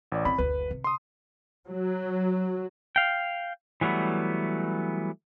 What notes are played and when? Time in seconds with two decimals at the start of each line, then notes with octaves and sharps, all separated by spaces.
0.12 A1 D5
0.25 C4 B5
0.38 F#1 D2 B4
0.71 C3
0.84 C6 D#6
1.67 F#3
2.96 F5 G5
3.81 E3 F#3 G3 A3 B3